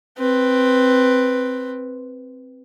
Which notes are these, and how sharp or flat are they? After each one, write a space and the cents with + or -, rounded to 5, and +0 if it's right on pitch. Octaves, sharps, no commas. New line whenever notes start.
C4 +0 B4 +0